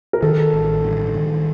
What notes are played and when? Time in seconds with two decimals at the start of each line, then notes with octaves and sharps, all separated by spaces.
0.13 A#4
0.22 D#3 A4
0.53 A1
0.84 G2
1.15 D#3